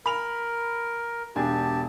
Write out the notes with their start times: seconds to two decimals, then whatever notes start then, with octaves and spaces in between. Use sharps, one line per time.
0.06 A#4 B5 F7
1.36 E1 D4 G4 G#5 A5